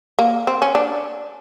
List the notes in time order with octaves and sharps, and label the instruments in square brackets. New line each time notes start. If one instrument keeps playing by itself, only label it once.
[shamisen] A#3
C4
C#4
D4